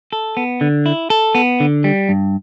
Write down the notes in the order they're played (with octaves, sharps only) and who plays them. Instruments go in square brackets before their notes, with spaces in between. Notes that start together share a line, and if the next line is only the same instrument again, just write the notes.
[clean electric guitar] A4
B3
D3
E4
A4
B3
D3
G3
G2